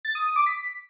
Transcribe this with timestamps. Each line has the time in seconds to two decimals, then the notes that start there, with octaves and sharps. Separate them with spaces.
0.05 A6
0.15 D#6
0.26 D#6
0.36 D6
0.46 B6